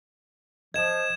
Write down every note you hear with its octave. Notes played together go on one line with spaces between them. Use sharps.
F3 D#5 G#6 E7